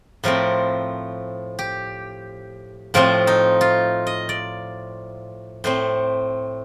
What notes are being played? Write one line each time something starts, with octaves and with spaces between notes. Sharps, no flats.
A2 F3 A3 C4 A#4
G4
A2 F3 A3 C4 F4
D#4
F4
D#5
D5
A2 A3 C4 C5